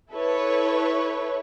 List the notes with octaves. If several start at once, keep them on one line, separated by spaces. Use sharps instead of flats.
E4 A4 B4 C#5